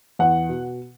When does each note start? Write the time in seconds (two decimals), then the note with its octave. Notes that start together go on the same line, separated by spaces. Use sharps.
0.19 E2 F#5
0.49 B2